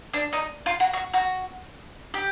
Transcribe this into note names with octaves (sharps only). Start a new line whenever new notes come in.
D4
D#4
F4
F#4
F#4
F#4
G4